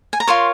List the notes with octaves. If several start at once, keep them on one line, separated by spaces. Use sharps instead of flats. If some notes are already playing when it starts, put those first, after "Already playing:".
G#5
A#5
F4 A#4 C#5 C6